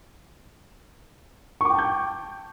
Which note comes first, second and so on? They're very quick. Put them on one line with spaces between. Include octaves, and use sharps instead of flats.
C#6 D6 G5 A5 G6